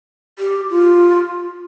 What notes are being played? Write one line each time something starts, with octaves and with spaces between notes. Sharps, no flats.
G4
F4